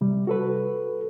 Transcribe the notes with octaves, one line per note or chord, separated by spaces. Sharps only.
C3 G3
F#4 A4 B4